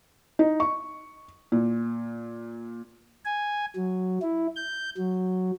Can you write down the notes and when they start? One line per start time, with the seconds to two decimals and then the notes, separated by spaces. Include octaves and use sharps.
0.39 D#4
0.60 C#6
1.52 A#2
3.25 G#5
3.76 F#3
4.22 E4
4.56 G6
4.97 F#3